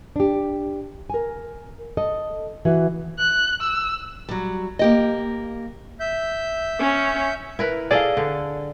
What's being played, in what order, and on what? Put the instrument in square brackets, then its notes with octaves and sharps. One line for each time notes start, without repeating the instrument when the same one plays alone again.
[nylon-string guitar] D4 G4
A#4 G#5
A4 D#5
E3 F#4
[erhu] F#6
E6
[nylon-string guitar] F#3 G3
A#3 G4 D#5
[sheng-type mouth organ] E5 G6
[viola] C#4
[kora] E4 A#4 B4
[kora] G#4 A4 D#5 [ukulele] D5 F5
[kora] D3